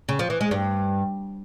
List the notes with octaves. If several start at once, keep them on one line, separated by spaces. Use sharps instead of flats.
C#3
F3
E3
G#3
G2